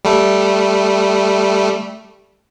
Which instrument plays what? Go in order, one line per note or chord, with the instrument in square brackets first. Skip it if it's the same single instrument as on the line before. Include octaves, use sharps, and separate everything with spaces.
[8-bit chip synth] G3 A3